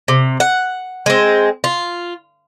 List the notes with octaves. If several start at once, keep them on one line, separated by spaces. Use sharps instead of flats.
C3
F#5
G#3 C4
F4